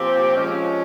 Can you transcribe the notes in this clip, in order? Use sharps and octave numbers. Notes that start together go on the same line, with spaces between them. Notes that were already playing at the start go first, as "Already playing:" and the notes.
Already playing: A#2 F3 C4 G4
F3 G#3 C#4